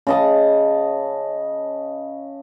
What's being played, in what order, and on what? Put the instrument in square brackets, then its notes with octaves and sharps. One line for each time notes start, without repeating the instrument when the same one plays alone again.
[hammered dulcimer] C#3 D#5 A5